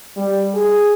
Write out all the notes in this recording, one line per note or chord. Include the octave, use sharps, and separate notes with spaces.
G3
G#4